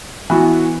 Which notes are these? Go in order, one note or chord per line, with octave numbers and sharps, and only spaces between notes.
E3 B3 F#4